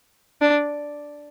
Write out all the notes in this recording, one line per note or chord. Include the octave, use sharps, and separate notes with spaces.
D4